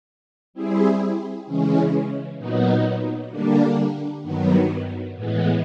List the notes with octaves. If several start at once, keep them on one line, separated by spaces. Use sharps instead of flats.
G3 C4 E4 G#4
C#3 E3 G#3 C#4
A#2 F#3 B3 D#4
D3 G3 A#3 D4
G2 D#3 F#3 B3
A2 E3 G#3 B3